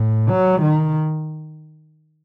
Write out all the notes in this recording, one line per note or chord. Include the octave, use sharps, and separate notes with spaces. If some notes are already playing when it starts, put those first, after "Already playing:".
Already playing: A2
F#3
D#3